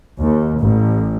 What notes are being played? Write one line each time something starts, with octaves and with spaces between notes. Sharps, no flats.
D#2
A1